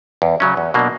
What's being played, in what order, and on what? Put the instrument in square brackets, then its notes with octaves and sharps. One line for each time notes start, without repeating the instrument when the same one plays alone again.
[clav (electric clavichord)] E2
C#3 F#3 C#4
E2
B2 F#3 A#3 D4